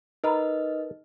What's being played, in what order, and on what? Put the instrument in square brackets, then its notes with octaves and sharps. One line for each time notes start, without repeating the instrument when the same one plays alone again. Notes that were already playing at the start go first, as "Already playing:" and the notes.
[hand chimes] D#4 D#5 F6 [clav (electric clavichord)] A#4 B4